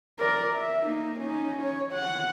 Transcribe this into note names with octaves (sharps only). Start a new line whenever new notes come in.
A#4 D5
E5
A#3 D#4
C#4 D#4
C#5
F#5